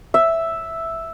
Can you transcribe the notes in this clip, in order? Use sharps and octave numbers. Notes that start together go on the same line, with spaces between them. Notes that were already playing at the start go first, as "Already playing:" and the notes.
E5